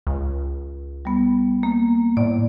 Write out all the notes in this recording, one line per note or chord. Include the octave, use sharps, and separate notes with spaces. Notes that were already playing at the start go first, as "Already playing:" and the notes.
C#2
G3 B3
A#3
A2 D5